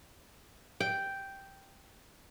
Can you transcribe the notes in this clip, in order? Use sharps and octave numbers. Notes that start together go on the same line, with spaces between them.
G5